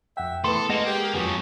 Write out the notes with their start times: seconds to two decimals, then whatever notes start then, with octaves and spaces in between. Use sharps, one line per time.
0.17 F2 E5 F#5 G5
0.44 E3 A3 B3 A4 B4 C6
0.70 G#3 A#3 D#5 F#5
0.86 G4 G#4 A#4
1.14 F2 F#3 B3 G#5